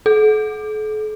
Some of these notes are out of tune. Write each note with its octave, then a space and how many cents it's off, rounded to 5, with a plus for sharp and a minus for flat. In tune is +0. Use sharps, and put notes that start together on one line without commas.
A4 -45